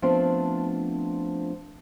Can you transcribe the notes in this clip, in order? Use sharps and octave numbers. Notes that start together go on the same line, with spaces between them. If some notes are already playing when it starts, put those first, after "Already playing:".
F3 A3 B3 C4 D4 F4